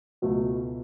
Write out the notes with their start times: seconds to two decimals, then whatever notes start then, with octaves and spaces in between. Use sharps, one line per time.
0.22 C#2 B2 F#3 A3